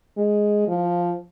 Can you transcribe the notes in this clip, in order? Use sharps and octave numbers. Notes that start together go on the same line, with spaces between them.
G#3
F3